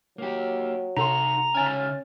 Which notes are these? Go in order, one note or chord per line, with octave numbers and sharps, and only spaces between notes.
F#3 A#3 G4
C3 D#4 F#4 A4 A#5 C6
C#3 C#4 E5 G#5 F6 A6